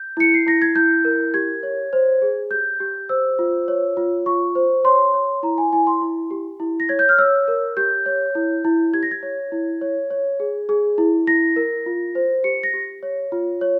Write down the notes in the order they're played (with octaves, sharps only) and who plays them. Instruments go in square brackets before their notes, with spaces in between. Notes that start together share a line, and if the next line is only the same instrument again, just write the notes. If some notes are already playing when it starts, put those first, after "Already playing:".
Already playing: [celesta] G6
E4 C#7
C7
E4 A#6
G#6
E4 G6
A#4
G4 G#6
C#5
C5
G#4
G4 G6
G4
C5 E6
F4
C#5
F4
F4 C#6
C5
C#5 C6
C#5
E4 A#5
G#5
E4 G#5
C6
E4
G4
E4
A#6
C#5 G#6
G6
F6
C#5 E6
A#4
G4 G6
C#5
E4
E4
G4 G#6
A#6
G#6
C#5
E4
C#5
C#5
G#4
G#4
E4
E4 A#6
A#4
F4
C5
G4 C#7
A#6
G4
C#5
F4
C#5